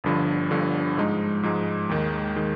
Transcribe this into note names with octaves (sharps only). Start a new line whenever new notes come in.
G1 G2 D3 F3
G1 G2 D3 F3
G#2 F3 G#3 D#4
G#2 F3 G#3 D#4
D#2 D#3 G#3
D#3 G#3